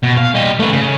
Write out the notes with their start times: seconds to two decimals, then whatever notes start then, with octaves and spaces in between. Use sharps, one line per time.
0.04 B2
0.18 F5
0.35 G3 D#5
0.59 A3 B4
0.72 C#3